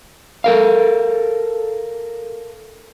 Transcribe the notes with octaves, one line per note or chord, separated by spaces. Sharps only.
A4 A#4 F5